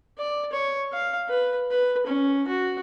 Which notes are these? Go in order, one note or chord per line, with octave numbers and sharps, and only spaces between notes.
D5
C#5
F5
B4
B4
C#4
F#4